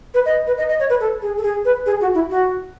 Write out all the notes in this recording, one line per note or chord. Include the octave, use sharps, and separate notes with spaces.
B4
D#5
B4
D#5
D#5
C#5
B4
A4
G#4
A4
G#4
B4
G#4
F#4
E4
F#4